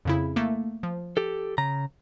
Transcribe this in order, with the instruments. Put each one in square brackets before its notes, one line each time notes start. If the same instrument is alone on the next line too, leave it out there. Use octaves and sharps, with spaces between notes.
[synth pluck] F2 C#3 E4
A3 A#3
F3
[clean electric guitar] G4 A4
C#3 A#5